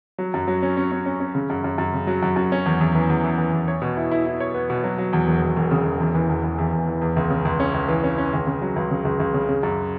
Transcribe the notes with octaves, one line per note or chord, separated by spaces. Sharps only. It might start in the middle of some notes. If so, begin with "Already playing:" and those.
F#3
F#2
F#3
C#4
C#4
C#4
C#4
C#4
C#3
F#2
F#2
F#2
C#3
F#3
F#2
F#2
C#4
E2
E2
E3
E2
E3
E3
E2
C#5
B2
E4
E4
E4
C#5
B3
B2
F#3
F#3
E2
E1
E2
E1
C#3
E1
E2
E3
E2
E2
E2
E2
E3
E2
C#2
C#3
C#2
C#4
C#2
E3
C#4
C#4
C#2
C#3
F#3
C#2
C#3
C#2
C#2
C#3
C#3
F#2